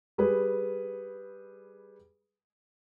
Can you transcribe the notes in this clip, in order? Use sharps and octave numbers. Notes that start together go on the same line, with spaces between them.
G3 G#4 B4